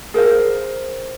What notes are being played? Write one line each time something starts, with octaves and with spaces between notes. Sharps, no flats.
G#4 A#4 C5 F5